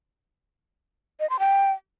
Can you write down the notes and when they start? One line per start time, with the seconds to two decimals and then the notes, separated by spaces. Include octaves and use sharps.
1.20 D#5
1.30 C6
1.40 G5